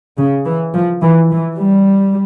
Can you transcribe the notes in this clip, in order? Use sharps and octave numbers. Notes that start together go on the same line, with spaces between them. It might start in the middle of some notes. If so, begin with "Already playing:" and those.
C#3
E3
F3
E3
E3
G3